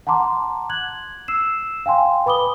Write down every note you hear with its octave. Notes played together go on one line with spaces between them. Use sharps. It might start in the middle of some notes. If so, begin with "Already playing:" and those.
F#5 A5 A#5 C6 D6
F#6 G#6 F#7
E6 C7 E7
F5 G5 G#5 C6
B4 B5 D6 D#6 G7